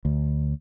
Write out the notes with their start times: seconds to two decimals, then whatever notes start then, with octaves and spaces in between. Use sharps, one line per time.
0.05 D2